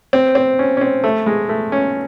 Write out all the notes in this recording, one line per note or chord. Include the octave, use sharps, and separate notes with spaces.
C4
C4
C#4
C#4
C4
A3
G#3
A3
C#4